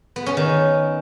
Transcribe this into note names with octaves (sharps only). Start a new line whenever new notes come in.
B3
C#4
D#3